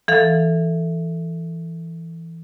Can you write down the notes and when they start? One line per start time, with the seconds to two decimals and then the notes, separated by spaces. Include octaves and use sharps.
0.08 E3 A4 F5